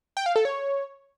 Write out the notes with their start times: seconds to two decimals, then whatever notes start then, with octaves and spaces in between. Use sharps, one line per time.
0.17 G5
0.26 F5
0.36 A4
0.45 C#5